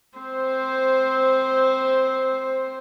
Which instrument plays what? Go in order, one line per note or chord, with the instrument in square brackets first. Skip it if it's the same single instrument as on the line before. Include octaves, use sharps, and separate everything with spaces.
[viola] C4 C5